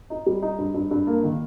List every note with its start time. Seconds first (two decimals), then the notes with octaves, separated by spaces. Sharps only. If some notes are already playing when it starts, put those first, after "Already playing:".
0.10 D#4
0.26 G3
0.42 D#4
0.58 G2
0.74 G2
0.91 G2
1.07 A#3
1.23 D#3